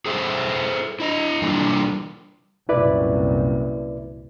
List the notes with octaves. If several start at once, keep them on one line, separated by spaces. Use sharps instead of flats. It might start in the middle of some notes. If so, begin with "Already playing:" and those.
G#4 A4 C5 E5
E4 D#5
E3 G3 A#3 D4 F4 A4
C2 F#2 A#2 E4 B4 D5